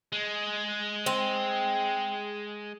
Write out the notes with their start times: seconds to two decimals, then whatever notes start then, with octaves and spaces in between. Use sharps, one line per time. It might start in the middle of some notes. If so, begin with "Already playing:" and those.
0.12 G#3
1.06 C4